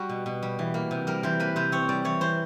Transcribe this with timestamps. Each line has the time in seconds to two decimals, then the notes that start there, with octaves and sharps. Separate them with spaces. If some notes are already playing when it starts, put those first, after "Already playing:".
Already playing: G3 F#4
0.09 B2
0.26 B2
0.42 G3
0.59 E3
0.74 A#3
0.91 C3
1.07 G3 A#4
1.23 E3 C5
1.40 A#3 B4
1.56 C3 C5
1.72 C4 C#5
1.89 G3 D5
2.04 E3 C#5
2.21 E3 C5